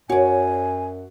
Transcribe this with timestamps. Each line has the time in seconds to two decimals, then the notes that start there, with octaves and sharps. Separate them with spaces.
0.09 F#2 F#4 C#5 D5 G#5